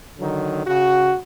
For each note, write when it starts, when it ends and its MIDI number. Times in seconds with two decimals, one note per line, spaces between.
0.19 0.64 50
0.19 0.64 51
0.19 0.64 54
0.64 1.14 49
0.64 1.14 66